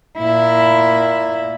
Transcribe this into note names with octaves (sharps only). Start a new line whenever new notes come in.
A#2 E4